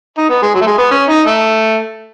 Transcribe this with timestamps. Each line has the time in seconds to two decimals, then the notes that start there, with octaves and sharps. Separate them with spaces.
0.18 D#4
0.30 B3
0.42 G#3
0.55 F#3
0.61 A3
0.67 G#3
0.78 B3
0.91 C#4
1.09 D#4
1.27 A3